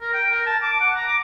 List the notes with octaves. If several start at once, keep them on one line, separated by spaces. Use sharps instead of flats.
A#4
G5
A#4
A5
D6
F#5
A#5
D6